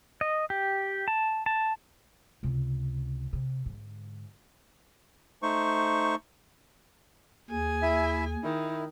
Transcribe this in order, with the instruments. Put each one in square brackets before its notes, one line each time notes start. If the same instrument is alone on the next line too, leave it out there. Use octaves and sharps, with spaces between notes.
[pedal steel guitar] D#5
G4
A5
A5
[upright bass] C#2 C3
C3
G#2 D3
[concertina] A3 D#4 C5 C#6
[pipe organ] D#2 [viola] G#4 G#5
[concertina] E4 E5
[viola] D#3 [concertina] E4